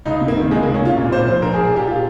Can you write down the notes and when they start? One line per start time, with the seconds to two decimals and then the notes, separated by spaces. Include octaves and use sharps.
0.05 C#2 D#4
0.21 C3
0.28 A#3
0.36 D#3
0.51 C#2 G#3
0.63 A#3
0.66 C#2
0.74 C#4
0.81 C3 F4
0.97 A#2
1.12 A#2 C5
1.27 A#1 C5
1.42 A#1 A#4
1.54 G#4
1.57 A#2
1.65 G#4
1.73 A#2 G4
1.87 F4